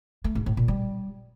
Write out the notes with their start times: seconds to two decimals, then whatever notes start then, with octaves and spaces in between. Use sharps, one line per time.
0.24 A3
0.35 G#2
0.46 A2
0.57 A#2
0.68 G3